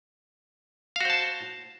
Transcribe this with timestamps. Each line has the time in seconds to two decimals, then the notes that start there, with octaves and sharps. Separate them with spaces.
0.96 F5
1.01 F#4
1.05 C5
1.10 A5